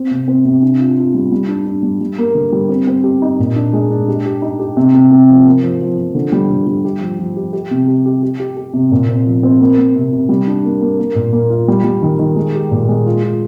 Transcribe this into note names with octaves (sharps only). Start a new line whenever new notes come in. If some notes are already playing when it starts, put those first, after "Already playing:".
Already playing: C4
C3
C4
C3
D4
F4
F4
G3
G3
D4
D4
G3
G3
A#3
D3
G3
C4
C4
G4
D#4
A#2
D4
G#3
D4
G4
G4
D#4
G4
C3
C3
C3
F3
A#3
F3
F3
F3
D3
G3
D3
G3
G4
F3
F3
G4
G4
C3
G4
G4
G4
G4
G4
C3
A#2
C4
F3
C4
A#3
A#3
C3
C3
G3
D4
A#3
A#3
A#3
A#2
A#3
F4
G3
G3
D#3
D#3
G#3
G4
A#2
G#3
F4
F4